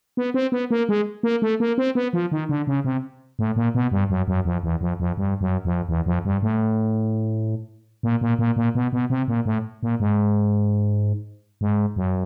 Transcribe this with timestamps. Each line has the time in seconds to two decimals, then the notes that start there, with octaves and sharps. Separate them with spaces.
0.17 B3
0.34 C4
0.52 B3
0.71 A#3
0.89 G#3
1.23 A#3
1.42 A3
1.60 A#3
1.78 C4
1.95 B3
2.13 F3
2.32 D#3
2.49 D3
2.67 C#3
2.84 C3
3.39 A2
3.56 A#2
3.75 B2
3.92 G2
4.10 F#2
4.28 F#2
4.45 F2
4.63 E2
4.81 F2
5.00 F2
5.17 G2
5.41 F#2
5.65 F2
5.89 E2
6.06 F2
6.25 G2
6.42 A2
8.03 A#2
8.21 A#2
8.39 A#2
8.56 A#2
8.75 B2
8.93 B2
9.10 C3
9.28 A#2
9.46 A2
9.83 A#2
10.00 G#2
11.61 G#2
11.96 F#2